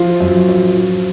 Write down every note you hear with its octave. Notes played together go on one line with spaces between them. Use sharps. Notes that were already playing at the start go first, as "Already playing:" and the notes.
Already playing: F3 F4
F#2
F#2
F3